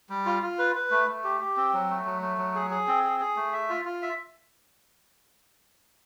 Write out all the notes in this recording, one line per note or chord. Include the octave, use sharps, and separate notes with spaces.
G3
F4
F4
B4
B4
A3
A3
G4
G4
C4
F#3
A3
F#3
A3
F#3
G#4
G#4
C4
G#4
G#4
A3
E5
F4
F4
E5